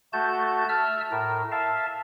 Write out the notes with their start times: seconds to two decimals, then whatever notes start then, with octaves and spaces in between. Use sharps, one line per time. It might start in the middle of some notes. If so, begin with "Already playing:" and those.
0.13 A3 F#4 A5 G6
0.69 E5 A5 E6 F6
1.11 A2 A#4
1.52 E5 F5 A5